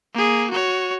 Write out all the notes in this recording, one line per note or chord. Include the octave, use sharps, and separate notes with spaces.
A#3 G#4
F#4 C#5